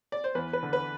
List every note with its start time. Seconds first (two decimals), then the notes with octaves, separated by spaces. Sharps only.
0.12 D5
0.24 C5
0.35 E2 B4
0.53 B4
0.63 D3
0.73 B4